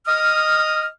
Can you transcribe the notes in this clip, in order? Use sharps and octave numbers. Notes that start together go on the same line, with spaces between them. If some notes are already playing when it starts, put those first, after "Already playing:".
D#5 D#6 F6